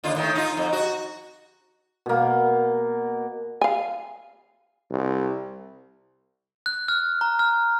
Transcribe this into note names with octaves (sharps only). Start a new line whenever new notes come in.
D#2 D3 F4
A2 D#3
D#4 F4
F2
F#4
B2 A#3
F5 G#5
C2
F#6
F6
A#5
F6